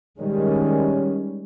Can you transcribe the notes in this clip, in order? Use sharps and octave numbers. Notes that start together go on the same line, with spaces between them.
D#3 G3 G#3 C#4